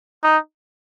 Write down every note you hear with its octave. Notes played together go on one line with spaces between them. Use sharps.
D#4